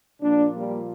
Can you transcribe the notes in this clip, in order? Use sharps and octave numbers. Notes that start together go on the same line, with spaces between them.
A#2 F3 A#3 D4
G3 A#3